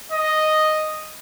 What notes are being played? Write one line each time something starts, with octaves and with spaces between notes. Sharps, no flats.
D#5